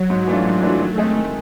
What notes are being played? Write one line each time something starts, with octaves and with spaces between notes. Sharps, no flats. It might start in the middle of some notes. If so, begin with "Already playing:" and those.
Already playing: F#3
G#2
E3 A3 D4 F4
G#2 F#3
E3 A3 D4 F4
D#3 A3
G#3 C4 D#4 G#4
D#3